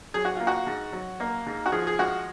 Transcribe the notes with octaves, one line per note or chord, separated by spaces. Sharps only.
F#3 G#4
F#4
A#3 F4
F#4
G#2
F#3
A#3
G#2
F#4
F3 G#4
G#4
G#3 F#4